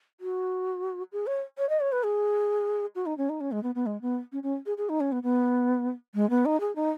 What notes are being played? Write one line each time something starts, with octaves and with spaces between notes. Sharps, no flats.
F#4
G#4
C#5
C#5
D#5
C#5
B4
G#4
F#4
D#4
C#4
D#4
C#4
G#3
B3
B3
G#3
B3
C#4
C#4
G#4
G#4
D#4
C#4
B3
B3
G#3
B3
D#4
G#4
D#4